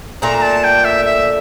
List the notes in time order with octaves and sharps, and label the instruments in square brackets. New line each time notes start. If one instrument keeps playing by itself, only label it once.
[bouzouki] A#2 A3 D4 [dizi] A#5
[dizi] A#5
A5
G5
E5
E5